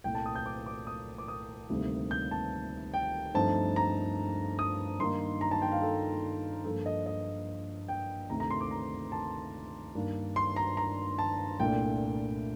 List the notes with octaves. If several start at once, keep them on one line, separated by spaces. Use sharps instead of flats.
C2 A#2 A3 G5
A5
D#6
G6
D6
D6
D#6
D6
D#6
D2 C3 D#3 G3 A#3
G6
A5
G5
G2 F3 A3 C4 D#4 A5
A#5
D#6
G2 D#3 A#3 D#4 C6
A#5
A5
G5
F5
A4
G2 F3 A#3 A4
D#5
D#5
G5
D2 C3 D#3 A3 D4 A#5
A#5
C6
D6
A#5
A5
G2 D#3 A#3 D4
C6
A#5
A#5
A5
C2 A#2 A3 D4 G5